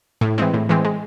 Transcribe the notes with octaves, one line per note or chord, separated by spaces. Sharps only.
A2
E3 G#3 C4
A2
E3 G#3 C4
G#3